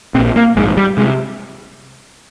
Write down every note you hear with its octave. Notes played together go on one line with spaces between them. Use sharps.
A#2 C4
A#1
A#3
A#1 G#2 G#3
G3
C3 G#3